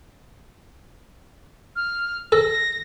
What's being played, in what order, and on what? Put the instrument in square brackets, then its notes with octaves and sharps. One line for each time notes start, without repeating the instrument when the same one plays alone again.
[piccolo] F6
[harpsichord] A4 [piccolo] A#6